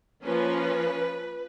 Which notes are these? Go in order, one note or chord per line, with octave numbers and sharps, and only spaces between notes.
F3 A#3 C#4 B4